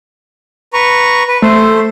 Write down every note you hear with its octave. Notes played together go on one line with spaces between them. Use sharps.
B4 A#5 C#6
B4
A3 C5